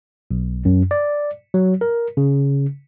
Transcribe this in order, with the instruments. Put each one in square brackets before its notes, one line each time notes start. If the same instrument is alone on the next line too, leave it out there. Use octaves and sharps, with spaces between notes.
[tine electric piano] B1
F#2
D5
F#3
A#4
C#3